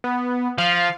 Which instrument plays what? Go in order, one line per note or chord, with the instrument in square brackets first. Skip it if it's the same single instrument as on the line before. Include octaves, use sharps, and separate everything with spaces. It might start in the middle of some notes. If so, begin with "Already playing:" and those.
[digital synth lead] B3
[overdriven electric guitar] F3 [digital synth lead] F5